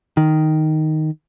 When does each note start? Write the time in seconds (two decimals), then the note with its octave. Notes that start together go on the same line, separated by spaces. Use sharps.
0.17 D#3